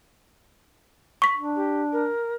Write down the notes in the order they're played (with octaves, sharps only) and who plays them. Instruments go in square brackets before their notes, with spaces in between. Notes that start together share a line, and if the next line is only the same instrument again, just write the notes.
[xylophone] C#6 B6
[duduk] D4
[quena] G4
A#4